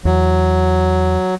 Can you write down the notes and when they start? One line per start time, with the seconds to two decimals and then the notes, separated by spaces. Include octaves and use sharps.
0.05 E2 F#3